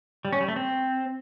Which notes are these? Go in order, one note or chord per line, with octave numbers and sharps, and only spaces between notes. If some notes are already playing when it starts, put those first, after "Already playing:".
G3
C#4
G3
A3
C4